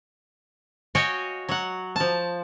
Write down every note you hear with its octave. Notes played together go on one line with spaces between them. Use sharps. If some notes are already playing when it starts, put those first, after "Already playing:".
F#4 C#5 D#5 F5 G5 G#5
F#3 F#5
F3 A5